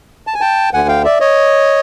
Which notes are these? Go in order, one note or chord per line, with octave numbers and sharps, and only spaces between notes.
A5
G#5
G5 A5
D2 D3 F#5 G#5
F5 G5
D5 E5
C#5 D#5